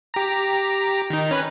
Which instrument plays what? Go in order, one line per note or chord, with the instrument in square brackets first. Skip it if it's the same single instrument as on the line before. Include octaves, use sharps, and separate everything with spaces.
[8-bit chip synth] G4 A#5
D#3 D#4
C#4 B4